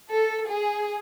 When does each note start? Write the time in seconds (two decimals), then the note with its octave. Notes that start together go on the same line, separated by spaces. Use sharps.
0.11 A4
0.48 G#4